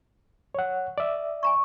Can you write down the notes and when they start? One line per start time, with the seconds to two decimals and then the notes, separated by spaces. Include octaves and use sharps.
0.55 C#5 F#5
0.98 D5 E5
1.43 G#5 A#5 C#6